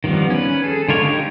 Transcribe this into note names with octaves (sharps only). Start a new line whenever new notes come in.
D#3 F3 G3 B3
C#4 B4
G#4 A4
D3 G#3 F4 A#4 C#5
D#4 G4